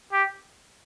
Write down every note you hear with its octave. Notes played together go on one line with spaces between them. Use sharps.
G4